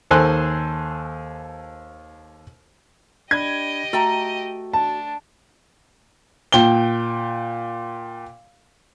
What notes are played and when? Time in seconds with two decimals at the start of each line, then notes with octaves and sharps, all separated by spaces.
0.11 D#2 A4 C5 G#5 C6 F#6
3.31 D4 G4 D5 D#5 B5 G#6
3.93 A3 F#4 G5 A#5
4.73 D4 A5
6.52 A#2 G5 G7